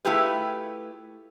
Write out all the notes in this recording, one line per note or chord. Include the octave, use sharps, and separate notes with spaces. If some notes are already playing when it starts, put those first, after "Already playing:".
A3 E4 F4 G4 G#4 B4